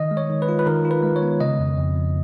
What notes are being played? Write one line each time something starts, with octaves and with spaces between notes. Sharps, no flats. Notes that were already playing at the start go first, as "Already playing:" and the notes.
Already playing: D#3 D#5
G#3
C#5
D#3
B4
F4
B4
D#3 A#4
F4
B4
G#3
C#5
B3
C#3 D#5
F2
F2
F2